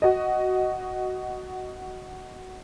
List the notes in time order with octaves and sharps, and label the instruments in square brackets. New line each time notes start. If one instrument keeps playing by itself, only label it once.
[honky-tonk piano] F#4 D#5